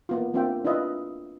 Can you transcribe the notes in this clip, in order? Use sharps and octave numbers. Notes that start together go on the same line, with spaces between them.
A#3 B3 F4
A#3 C4 D4 F4 E5 G5
D4 E4 F4 B4 D#5 E5